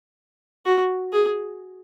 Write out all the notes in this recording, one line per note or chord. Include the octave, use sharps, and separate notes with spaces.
F#4
G#4